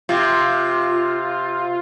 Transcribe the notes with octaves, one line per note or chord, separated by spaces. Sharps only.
C3 F4